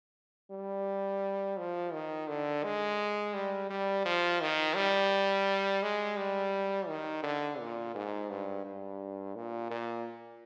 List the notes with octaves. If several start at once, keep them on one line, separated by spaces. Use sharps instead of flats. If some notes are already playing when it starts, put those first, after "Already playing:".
G3
F3
D#3
D3
G#3
G3
G3
F3
D#3
G3
G#3
G3
D#3
D3
A#2
G#2
G2
G2
A#2
A#2